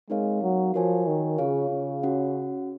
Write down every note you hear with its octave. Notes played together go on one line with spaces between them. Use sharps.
G#3 C4 D#4 A#4 C#5 F5
F#3
F3 F#4 A#4 C#5 G#5
D#3
C#3 F4 G#4 C#5 F5
C#3
C#4 F#4 C#5 F#5